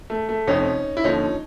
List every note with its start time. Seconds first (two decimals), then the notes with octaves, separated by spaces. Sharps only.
0.10 A3
0.29 A3
0.47 F1 F2 C3 C#4 D#4
0.97 E4
1.04 D#2 D3 F3 C#4 D#4